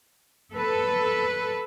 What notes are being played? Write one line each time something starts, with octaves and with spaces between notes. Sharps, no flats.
A4 B4